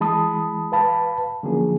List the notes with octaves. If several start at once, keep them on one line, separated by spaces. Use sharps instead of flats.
E3 G#3 A5 B5 D#6
B4 F5 A5 B5
D3 F3 F#3 A#3 C#4 G#4